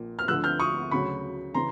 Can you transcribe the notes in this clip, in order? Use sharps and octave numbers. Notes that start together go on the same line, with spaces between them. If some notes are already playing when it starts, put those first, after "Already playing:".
Already playing: A#1 A#2 F3
F6
D2 D3 F3 E6 F#6
F6 G6
C#6 D#6
D2 C#3 F#3 B5 C#6
C#3 E3 A#5 C6